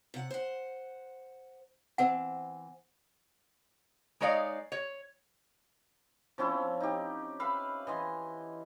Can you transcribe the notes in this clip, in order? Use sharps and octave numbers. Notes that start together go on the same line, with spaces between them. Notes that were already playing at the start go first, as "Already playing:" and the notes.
C3 F#5
C5 F#5
E3 C4 C5 F#5
G#3 D#4 C#5 D5 F5
C#5
F3 C4 C#4 E4
D#4 G4
B4 E5 F5 B5
E3 D#5 C6